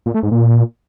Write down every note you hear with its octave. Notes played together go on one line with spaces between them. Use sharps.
A#2
A3
G#2
A#2